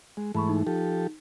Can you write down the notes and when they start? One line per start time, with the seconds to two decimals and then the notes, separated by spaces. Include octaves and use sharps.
0.17 G#3
0.35 G#2 E3 A3 A5 B5 C#6
0.49 D#4
0.67 F3 G4 A4